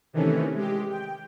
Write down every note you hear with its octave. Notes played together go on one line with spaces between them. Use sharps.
C3 D#3 E3 A3 C#4
G#3 G4
G5